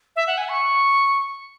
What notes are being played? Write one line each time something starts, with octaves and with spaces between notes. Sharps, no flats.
E5
F#5
G#5
C#6